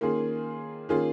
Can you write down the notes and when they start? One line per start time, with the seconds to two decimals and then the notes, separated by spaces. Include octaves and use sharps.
0.01 D#3 A#3 C#4 F4 G#4
0.89 D#3 A#3 C#4 F4 G#4